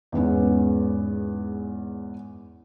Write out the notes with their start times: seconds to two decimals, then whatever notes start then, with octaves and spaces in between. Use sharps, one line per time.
0.12 E2 G#2 B3 C#4